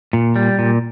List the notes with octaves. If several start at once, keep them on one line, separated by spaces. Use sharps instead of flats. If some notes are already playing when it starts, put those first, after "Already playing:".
A#2
G3
A#2